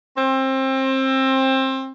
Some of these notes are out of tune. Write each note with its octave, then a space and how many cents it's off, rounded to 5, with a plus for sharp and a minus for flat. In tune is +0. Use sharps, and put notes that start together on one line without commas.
C4 +25